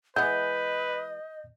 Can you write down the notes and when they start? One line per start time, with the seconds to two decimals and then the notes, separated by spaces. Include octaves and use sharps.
0.16 E3 G#3 B3 B4 D#5 G6